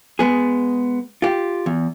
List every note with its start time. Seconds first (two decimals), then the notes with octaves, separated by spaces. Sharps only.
0.19 G#3 B3 G#4
1.22 F4 G4
1.66 E2